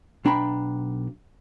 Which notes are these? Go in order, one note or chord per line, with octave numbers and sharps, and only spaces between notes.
B1 D4 G5 A#5 B5